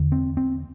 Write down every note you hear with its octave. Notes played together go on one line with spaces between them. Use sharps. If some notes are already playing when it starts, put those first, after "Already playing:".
Already playing: E2 D3
C4
C4